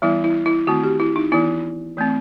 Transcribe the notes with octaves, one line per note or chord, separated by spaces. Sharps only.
E3 G3 B3 E4
E4
E4
D#3 A3 C4 F#4
G4
E4
D#4
E3 B3 E4
E3 A3 C4